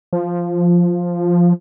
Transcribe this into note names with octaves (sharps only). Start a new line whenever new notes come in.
F3